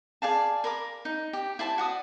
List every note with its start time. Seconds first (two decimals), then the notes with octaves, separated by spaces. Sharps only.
0.22 G#4 D5 F5 A5
0.64 A#4 B5 D6
1.05 D#4
1.33 G4
1.59 E4 C5 A5
1.78 F#4 D5 D#6